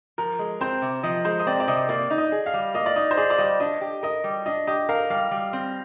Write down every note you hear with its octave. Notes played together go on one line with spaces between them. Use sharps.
F3 A#4
G#3
C4 C5
C3
F3 D#5
G#3 C5
D#5
C4 D5
D5
C3 D#5
A#3 D5
D#4
D#5
G#4
F5
G3
A#3 D#5
D5
D#4 D#5
C5
G#4 D5
D5
G3 D#5
D4 D#5
G4
A#4 D#5
G3
D4 D#5
G4 D#5
A#4 F5
G3 F5
G3
C4